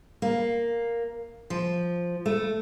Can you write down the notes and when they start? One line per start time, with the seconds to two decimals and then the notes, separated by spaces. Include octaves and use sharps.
0.22 A#3
1.50 F3
2.26 A3